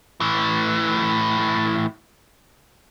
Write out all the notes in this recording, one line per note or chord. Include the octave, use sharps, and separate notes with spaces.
A2 E3